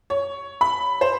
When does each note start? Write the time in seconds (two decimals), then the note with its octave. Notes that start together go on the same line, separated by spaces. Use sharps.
0.10 C#5
0.61 B5
1.01 C5